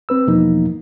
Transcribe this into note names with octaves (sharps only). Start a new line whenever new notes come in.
C4 B4 E6
E2 B2 E3 F3 A#3 D#4